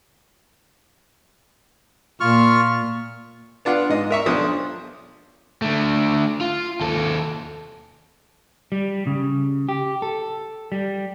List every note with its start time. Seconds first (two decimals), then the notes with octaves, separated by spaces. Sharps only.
2.20 A#2 F4 C#6 F6
3.65 B3 D4 F4 F#5
3.89 G#2 D#5
4.11 A#4 E5 C#6
4.26 B1 F3 D4 D#6
5.62 D3 A3
6.41 F4
6.81 D#2 A4
8.72 G3
9.07 C#3
9.69 G4
10.02 A4
10.72 G3